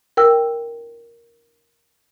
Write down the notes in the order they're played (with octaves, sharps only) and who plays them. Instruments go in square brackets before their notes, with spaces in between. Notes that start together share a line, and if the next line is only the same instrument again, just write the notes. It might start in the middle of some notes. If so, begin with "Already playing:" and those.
[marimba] A#4 G5 E6